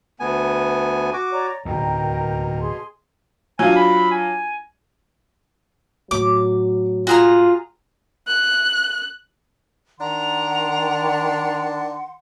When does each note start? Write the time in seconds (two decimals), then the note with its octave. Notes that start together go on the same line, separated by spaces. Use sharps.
0.20 D2 B3 G#5
1.13 F#4 D6
1.31 C#5 D5 A#5
1.65 D1 D#2 B2 A#4 G5 A#5
2.61 G#4 C6
3.59 F#3 D4 F4 G#5
3.76 B5
4.11 G#5
6.11 A2 D#3 F#3 D6
7.07 F4 F#4 G#4 A#5
8.27 F#6
10.00 D#3 D4 F#5 A#5 C6